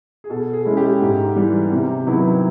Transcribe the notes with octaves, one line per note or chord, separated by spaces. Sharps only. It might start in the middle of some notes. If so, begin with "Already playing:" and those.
G#4
B2 A4
G#4
G#3 C#4 E4
G4
G#2
E3 G3
C3
D#3 F#3 B3 E4